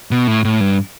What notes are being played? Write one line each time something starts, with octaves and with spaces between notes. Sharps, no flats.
B2
A2
A2
G2